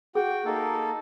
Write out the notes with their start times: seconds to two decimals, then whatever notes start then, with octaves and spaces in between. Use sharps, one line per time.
0.15 F#4 G#4 G5
0.45 A#3 D#4 A4